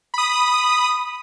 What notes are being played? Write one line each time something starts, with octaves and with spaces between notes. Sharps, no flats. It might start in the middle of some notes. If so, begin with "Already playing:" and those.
B5 D#6